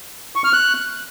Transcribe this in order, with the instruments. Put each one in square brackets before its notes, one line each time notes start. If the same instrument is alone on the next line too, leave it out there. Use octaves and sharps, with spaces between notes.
[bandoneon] C#6
F6
F#6